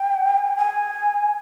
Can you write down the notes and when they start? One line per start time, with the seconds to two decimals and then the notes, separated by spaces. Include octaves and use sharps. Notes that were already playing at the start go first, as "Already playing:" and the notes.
Already playing: G5
0.37 G#5
0.47 G5
0.56 G#5